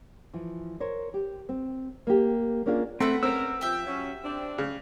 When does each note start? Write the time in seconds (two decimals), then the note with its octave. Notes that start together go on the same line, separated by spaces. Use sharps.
0.34 E3 F3
0.80 A#4 C5 C#5
1.14 G4
1.49 C4
2.07 A#3 G4
2.66 A#3 C#4 D4 F4 G#4
3.00 A3 C4 B4 E5 F#5
3.23 C#3 C4 A#4 E6
3.61 F3 G4 E5
3.87 F#3 C#4
4.24 C4 D4
4.58 C#3